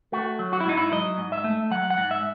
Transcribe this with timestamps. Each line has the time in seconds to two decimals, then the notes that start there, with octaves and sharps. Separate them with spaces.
0.12 A3 F#4
0.39 F#3
0.53 F#4
0.60 E4
0.66 G#2 D#4
0.77 E4
0.92 F#3 D#5
1.18 G#2
1.32 E5
1.44 A3
1.71 F#3 F#5
1.90 F#5
1.97 G#2
2.11 E5